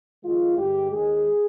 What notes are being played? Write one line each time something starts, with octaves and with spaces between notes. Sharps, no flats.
F2 D#3 G#3 F4
G2 D3 G#3 G4
D#2 D#3 G#3 G#4